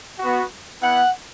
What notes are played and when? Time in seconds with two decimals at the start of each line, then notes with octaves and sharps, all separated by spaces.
0.18 B3 F#4
0.81 B3 E4 F#5